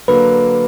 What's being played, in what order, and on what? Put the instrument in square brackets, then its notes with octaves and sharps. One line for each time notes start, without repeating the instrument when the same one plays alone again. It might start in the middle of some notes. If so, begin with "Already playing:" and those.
[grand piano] D3 F#3 A#3 [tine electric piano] B4